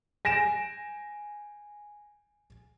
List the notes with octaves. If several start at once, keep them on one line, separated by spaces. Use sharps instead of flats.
G#5 A#6 D7 E7